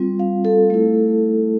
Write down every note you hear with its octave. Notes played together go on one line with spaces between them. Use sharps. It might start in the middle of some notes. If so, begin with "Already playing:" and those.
Already playing: G3 C4 F4
F5
A4
A3 E4